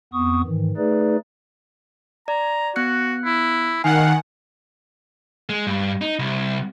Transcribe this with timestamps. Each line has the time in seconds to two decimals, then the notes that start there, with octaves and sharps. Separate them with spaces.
0.13 F2 B3 C#6 D#6
0.44 G#2 D#3 E3
0.77 A3 D#4 G#4 B4 D5
2.28 D5 A#5
2.76 B3 F#4 F#6 C#7
3.25 E4
3.84 D#3 F5 F#5 G#5
5.49 G#3
5.67 G2
6.01 D#4
6.19 C2